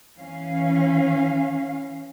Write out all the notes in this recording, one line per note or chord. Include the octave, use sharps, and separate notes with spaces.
E3 C#4 F5